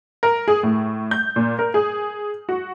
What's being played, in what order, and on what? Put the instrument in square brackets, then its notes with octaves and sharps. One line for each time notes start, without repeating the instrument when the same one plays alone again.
[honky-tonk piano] A#4
G#4
A2
G6
A#2
A#4
G#4
F#4